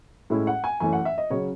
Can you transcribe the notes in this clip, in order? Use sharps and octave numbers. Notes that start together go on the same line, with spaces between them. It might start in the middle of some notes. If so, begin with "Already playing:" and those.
A2 G#3 C#4 E4
F#5
G#5
F#2 E3 A3 C#4 G#5
F#5
E5
D#5
C#3 F#3 C#4 C#5